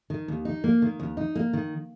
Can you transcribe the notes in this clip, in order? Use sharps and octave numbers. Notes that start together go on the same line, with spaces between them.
D#3
D#2
D#4
A#3
D#3
D#2
D#4
A#3
D#3